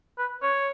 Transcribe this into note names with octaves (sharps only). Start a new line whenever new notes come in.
B4
C#5